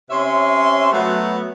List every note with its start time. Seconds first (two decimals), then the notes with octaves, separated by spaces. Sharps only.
0.11 C3 C#4 C#5 E5 C6
0.91 F#3 A3 B3